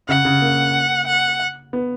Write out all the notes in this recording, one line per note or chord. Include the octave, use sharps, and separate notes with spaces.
C#3 F#5
C#3
A#3
F#5
B3